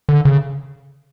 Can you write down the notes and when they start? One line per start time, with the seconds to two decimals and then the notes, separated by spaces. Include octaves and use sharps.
0.09 D3
0.25 C#3